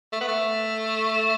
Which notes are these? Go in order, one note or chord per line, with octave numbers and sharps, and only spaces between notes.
A3
B3
A3